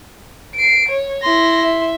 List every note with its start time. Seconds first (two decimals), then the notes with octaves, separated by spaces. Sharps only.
0.55 C7 D7
0.88 C#5
1.23 E4 C6 A#6
1.62 E5